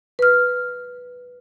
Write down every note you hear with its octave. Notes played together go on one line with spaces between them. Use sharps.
B4 F6